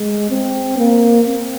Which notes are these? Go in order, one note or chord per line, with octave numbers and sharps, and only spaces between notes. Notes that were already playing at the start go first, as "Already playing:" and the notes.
Already playing: G#3
C4
A#3
C4